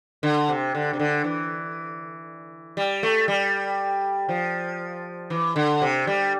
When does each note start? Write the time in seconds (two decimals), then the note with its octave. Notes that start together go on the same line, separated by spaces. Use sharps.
0.23 D3
0.49 C3
0.75 D3
0.93 C3
0.99 D3
1.24 E3
2.77 G3
3.03 A3
3.28 G3
4.29 F3
5.30 E3
5.56 D3
5.82 C3
6.07 G3